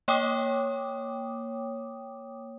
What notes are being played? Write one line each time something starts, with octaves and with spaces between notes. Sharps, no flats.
A#3 C#5 G5 D6 D#6